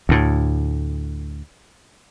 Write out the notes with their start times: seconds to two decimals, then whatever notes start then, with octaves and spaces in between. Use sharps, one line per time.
0.09 D2 A2